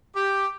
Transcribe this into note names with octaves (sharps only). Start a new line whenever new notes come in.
G4